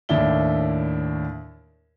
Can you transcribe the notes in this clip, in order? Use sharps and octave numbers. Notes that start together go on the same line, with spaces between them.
D#2 A2 D4 E4 G7